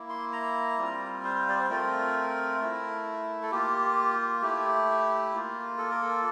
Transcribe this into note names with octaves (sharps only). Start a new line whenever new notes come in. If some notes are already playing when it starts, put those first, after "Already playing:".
Already playing: A#3 E4
C6
A#5
G3 C4 F4
C5
D5
C5
A3 C4 F4 A#4
A3 E4
A4
A#3 F4 G4
A3 E4 G4
A#3 F4
A4
A#4
A4